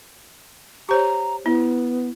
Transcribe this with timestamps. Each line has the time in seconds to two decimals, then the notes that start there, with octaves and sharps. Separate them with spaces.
0.89 G4 C5 C#5 A#5
1.46 B3 E4